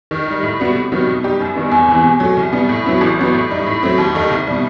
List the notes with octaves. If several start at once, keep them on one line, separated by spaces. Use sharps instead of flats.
D#3
G3 D#4
A2
G3 B3 F#4
C3
D#3 F#3 B3
B2
G3 D#4 G4
F#2
D#3 G3 B3
E2
C3 E3
B2
F#3 A3
C2
B2 G3 B3
A2
F#3 B3 E4
A1
G2 F#3 B3
A2
G3 D#4
A2
F#3 A3 C4
D#2
D#3 A3 D#4
C2
B2 G3